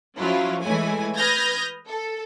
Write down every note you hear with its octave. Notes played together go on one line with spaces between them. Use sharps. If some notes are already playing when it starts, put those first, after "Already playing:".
F3 F#3 C#4 E4 F4
E3 G#3 A3 E4 C#5 G#5
B4 D#6 F6 G6 G#6 A#6
A4